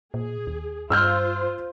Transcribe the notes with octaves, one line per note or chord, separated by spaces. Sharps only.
A#2 G#4
D#2
G2 F4 C5 E6 F6 G6